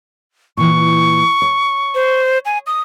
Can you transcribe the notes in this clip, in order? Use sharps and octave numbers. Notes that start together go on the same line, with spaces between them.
A#2 E3 C#6
C#5
C5
G#5
D#6